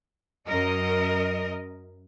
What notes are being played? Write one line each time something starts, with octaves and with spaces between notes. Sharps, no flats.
F#2 A#4 D#5